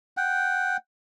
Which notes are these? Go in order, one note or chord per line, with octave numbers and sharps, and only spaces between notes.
F#5 G5